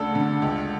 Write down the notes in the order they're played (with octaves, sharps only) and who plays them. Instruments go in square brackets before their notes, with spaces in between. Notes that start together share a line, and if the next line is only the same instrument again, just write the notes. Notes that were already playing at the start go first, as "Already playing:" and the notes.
Already playing: [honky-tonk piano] D2 C#3 D4 [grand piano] A4
[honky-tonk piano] D3
C#2